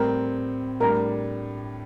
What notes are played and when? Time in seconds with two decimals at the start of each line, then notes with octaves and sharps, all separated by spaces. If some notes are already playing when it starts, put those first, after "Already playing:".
Already playing: A2 G3 C4 A#4 A#5
0.80 A2 G3 D4 A#4 A#5